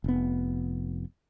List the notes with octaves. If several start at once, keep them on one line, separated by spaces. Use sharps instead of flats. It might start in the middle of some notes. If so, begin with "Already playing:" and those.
F1 B3